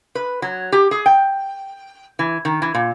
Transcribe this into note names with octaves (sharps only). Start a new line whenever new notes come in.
B4
F#3
G4
G#4
G5
E3
D#3
E3
A#2